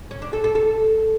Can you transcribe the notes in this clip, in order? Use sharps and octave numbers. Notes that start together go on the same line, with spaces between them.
C#4
D4
A4
A4
A4